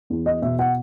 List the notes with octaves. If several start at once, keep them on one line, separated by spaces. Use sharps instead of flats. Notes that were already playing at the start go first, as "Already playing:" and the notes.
E2
D#5
B2 E5
F#5